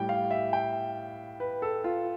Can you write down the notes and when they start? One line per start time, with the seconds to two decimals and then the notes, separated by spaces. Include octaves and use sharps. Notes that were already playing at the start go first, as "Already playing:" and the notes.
Already playing: A2 G3 G5
0.09 F5
0.31 E5
0.53 G5
1.40 B4
1.62 A4
1.84 F4